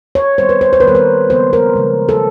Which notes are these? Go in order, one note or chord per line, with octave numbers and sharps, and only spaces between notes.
C#5
D#3 G3 B3 C5
B4
C5
C5
B4
D#3 G3 B3 A#4
B4
C#3 F3 G#3 B3 C5
A#4
C#3 F3 G#3 B3
A4